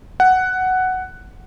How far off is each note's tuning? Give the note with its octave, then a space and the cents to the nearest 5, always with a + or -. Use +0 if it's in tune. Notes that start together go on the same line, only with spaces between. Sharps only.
F#5 +5